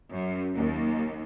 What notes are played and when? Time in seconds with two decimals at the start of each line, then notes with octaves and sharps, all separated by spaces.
0.11 F#2
0.55 D#2